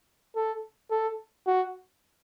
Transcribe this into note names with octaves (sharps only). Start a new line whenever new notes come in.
A4
A4
F#4